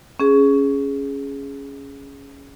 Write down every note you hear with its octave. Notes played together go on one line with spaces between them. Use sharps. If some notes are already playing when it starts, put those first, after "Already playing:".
C#4 G#4